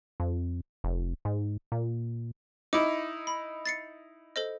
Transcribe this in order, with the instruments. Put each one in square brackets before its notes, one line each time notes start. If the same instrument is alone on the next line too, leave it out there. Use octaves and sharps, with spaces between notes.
[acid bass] F2
F1
G#2
A#2
[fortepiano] D#4 E4 [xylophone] D6
[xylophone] B5
A6 C7 C#7
A4 C5 D#5